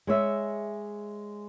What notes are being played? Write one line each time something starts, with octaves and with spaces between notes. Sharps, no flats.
G#3 C#5 E5